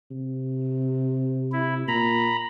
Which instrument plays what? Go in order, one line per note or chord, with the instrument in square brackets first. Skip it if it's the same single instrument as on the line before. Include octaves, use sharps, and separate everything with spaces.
[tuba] C3
[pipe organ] E4
[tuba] A#2 [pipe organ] A#5 B5